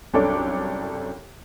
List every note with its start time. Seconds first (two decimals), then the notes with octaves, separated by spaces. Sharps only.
0.14 C2 F#2 D4 A4 C#5 D6